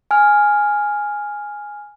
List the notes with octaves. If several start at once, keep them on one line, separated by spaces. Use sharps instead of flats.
G#5 F6